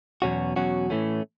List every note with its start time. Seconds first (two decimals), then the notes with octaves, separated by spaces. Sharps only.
0.22 E2 B2 F#3 C#4 F#4
0.56 E2 B2 F#3 C#4 F#4
0.90 A2 E3 A3 C#4